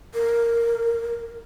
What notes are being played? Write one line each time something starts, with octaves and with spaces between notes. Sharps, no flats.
A#4